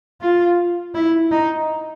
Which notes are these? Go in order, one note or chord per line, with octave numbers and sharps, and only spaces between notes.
F4
E4
D#4